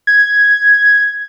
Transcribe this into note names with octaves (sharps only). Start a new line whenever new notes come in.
G#6